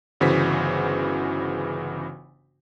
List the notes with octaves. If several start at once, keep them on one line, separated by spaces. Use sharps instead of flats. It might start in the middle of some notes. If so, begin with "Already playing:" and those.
G1 C#3 E3 F#4 C5 B6